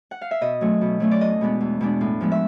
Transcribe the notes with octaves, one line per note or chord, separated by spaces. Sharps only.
F#5
F5
E5
B2 D#5
F#3 A3 C#4
B2
F#3 A3 C#4
D5
E2 D#5
B2 G#3 B3 D4
E2
B2 G#3 B3 D4
A2
F3 G#3 B3
E5